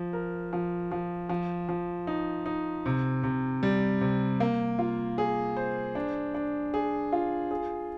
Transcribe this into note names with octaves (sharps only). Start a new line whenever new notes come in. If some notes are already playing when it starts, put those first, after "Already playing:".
Already playing: F3
A#4
F3
F3
F3
F3
D#4
D#4
C3
C3
G3
C3
A#3
F4
G#4
C5
D4
D4
G#4
F4
G#4